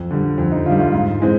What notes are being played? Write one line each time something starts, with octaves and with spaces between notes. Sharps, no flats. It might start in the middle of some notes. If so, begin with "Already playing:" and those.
Already playing: F2
D3 G3
F2
D#4
D3 G3 F4
F4
G#2
E3 G#3 C4